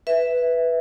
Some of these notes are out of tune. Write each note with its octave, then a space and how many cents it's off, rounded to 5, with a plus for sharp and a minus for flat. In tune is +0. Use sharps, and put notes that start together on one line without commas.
B4 +0 E5 +0